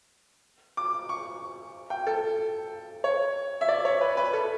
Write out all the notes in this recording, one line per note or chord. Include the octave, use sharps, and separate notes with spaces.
D6
C#6
G5
A4
C#5
E5
D5
C#5
B4
B4
A4